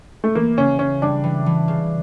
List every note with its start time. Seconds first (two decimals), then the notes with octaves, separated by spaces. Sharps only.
0.24 A3
0.35 E3 A#3
0.57 C#3 C#4
0.79 C#3 C#4
1.02 G3 D4
1.24 E3
1.46 E3
1.68 C#3